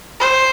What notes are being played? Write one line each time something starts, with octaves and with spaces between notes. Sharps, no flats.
C5